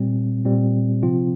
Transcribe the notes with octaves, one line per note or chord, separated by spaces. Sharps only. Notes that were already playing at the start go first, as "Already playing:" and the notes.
Already playing: A#2 G3 C4
A#2 G3 C4
C3 F3 C4 F4